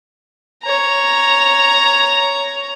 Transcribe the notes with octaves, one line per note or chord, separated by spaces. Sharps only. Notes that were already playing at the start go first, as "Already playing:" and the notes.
C#5 A#5